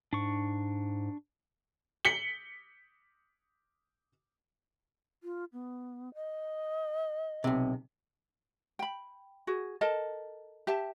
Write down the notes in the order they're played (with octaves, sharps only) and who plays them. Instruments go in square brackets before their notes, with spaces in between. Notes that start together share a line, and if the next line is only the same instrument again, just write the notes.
[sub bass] G#2 [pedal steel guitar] D4 C#6
[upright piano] B6 C#7 F#7 G7
[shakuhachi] F4
B3
D#5
[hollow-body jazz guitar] B1 C3
[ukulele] G5 B5
F#4 G#4
A4 A#4 D#5 A5
G4 E5 A5